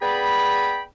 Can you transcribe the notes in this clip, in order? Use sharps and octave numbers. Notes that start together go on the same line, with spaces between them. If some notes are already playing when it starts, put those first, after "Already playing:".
B3 G#4 D5 G5 B5